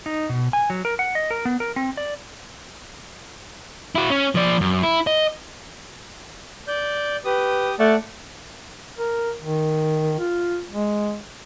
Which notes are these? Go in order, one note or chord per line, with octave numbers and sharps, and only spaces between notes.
D#4
B2
G#5
F#3
A#4
F#5
D#5
A#4
B3
A#4
C4
D5
E4 F#4
C#4
F3 D5
F#2
E4
D#5
D5 G6
G4 B4 D#6
A3 D5 F#5 A5
A#4
D#3
F4
G#3